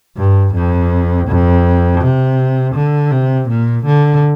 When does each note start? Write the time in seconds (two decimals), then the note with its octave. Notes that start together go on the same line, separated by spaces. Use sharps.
0.17 G2
0.54 F2
1.28 F2
2.00 C3
2.75 D3
3.11 C3
3.49 A#2
3.85 D3